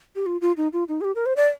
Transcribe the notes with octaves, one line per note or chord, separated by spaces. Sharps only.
G4
F4
F4
D#4
F4
D#4
G#4
G4
A#4
C5
D5